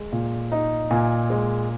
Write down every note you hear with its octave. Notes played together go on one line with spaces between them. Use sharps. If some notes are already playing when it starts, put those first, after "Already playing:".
Already playing: G#3
A#2
D#4
A#2 G#5
G#3